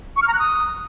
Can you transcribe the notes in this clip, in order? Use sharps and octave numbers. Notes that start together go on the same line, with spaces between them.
C#6
F6
A#5
F#6
D#6